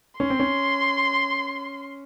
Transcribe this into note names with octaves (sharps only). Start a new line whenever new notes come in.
C#4 C6
C4
C#4